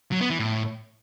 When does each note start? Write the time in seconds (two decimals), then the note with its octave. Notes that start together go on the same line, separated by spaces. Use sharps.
0.12 F#3
0.21 B3
0.30 E3
0.39 A2